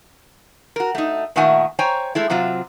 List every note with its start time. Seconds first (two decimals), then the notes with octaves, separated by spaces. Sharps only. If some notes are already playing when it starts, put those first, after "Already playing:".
0.76 F#4 A#4
0.95 A3 D#4
1.36 A#2 D#3 A3 E5 F#5 G#5
1.79 C5 C#5 G5 G#5 A#5
2.15 G#3 A3 E4
2.30 C3 F#3 C4 F4